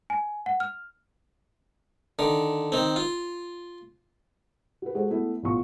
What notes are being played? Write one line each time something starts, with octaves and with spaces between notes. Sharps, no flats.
G#5
F#5
F6
D3 D#3
D#3 C4
F4
F#4 B4
G#3 F#4 G#4 A4 C5
A3 B3 E4
A1 B2 B3 F4 C#6